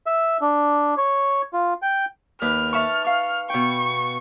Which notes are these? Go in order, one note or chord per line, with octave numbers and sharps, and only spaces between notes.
E5
D4
C#5
F4
G5
D#2 B4 F6
E5 A5 C#6
F5 C#6
B2 G5 C#6